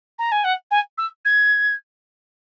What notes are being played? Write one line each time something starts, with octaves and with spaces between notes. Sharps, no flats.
A#5
G#5
F#5
G#5
E6
G#6